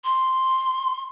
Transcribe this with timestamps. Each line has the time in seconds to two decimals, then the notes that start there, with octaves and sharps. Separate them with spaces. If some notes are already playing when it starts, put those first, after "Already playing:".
0.04 C6